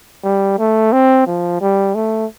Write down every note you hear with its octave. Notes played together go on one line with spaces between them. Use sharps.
G3
A3
C4
F3
G3
A3